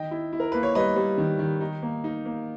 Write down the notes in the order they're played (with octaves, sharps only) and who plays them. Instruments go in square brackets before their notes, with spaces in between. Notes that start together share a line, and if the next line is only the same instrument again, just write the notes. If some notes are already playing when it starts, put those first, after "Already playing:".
Already playing: [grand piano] D#3 D#5 G5
E4
E4
A#4
A#3 B4
C#5
G3 B4 D#5
G3
D#3
D#3
D#4
A#3
D#4
A#3